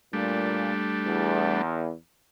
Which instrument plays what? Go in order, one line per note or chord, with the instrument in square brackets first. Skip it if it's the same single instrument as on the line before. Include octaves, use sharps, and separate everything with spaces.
[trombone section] A#2 [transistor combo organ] G3 A3 D4
[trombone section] E2